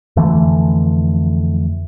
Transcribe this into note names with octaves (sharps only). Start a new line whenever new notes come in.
F2 D3 E3 A3